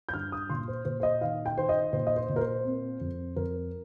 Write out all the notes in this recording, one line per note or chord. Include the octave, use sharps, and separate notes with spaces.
G6
G2 F6
D#6
A#2 C6
C5
A#2 C5
C5
D#5
D#3 F5
G5
D#3 C5
D#5
A#2 C5
D#5
C5
A#2
A#4
C5
C4
F2
F2 A#4